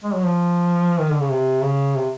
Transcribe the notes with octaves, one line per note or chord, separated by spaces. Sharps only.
G#3
F#3
F3
D#3
D3
C#3
C3
C#3
C3